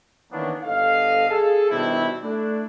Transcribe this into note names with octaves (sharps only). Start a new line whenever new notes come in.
D#3 E3 A#3 B3 C#4 D4
G1 A4 D#5 F5
G#4 A4
B2 D#3 G3 C4 D4 E4
A3 D4 E4